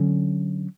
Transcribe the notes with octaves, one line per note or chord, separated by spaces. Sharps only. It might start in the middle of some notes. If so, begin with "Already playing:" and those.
Already playing: D3 F#3 C#4